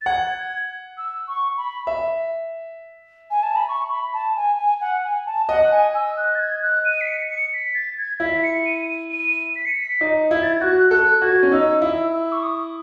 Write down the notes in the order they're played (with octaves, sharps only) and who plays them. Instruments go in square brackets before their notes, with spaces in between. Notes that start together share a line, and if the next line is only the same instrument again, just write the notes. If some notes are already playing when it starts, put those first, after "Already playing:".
[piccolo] A6
[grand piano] F#5 [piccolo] G#6
[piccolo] G#6
E6
C#6
B5
[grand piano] E5
[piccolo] G#5
A5
B5
C#6
B5
A5
G#5
G#5
F#5
G#5
A5
[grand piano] D#5 [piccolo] F#5
[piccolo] G#5
E6
F#6
A6
G#6
F#6
D#7
B6
C#7
C#7
B6
A6
G#6
[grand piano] E4 [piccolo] B6
[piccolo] C#7
D#7
D#7
D#7
B6
C#7
B6
[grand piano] D#4
[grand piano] E4 [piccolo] G#6
[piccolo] A6
G#6
[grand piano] F#4 [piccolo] F#6
[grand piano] A4 [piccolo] F#6
[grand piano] F#4 [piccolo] G#6
[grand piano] C#4
[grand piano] D#4 [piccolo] E6
[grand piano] E4 [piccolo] E6
[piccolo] E6
C#6
D#6